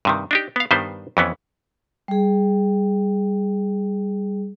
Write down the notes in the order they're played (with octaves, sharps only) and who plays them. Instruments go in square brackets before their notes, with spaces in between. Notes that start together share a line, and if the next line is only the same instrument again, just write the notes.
[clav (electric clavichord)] G2 C3 D#3
D4 D#4 G4
B3 F5
G2 D#3 G3 B3 C5
F2 E3 B3 C#4
[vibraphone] G3 G#4